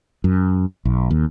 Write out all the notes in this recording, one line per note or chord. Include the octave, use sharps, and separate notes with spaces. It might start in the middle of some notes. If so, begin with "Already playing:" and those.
F#2
B1
D#2